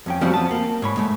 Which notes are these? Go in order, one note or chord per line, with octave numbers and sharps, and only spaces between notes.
F2 C#4 G5
F3 G3 C4 C#4 F#4
F2 B3 A5
A#3
G#2 C#5 B5
G#3 A3